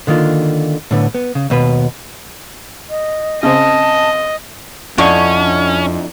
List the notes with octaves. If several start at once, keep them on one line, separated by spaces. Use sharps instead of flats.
D3 D#3 A#3 F4
A2 D3 B3
B3
C#3
D#2 B2 B4
D#5
C#3 C4 D#5 A5
F2 D3 C#4 D4 E4 D#5 C#6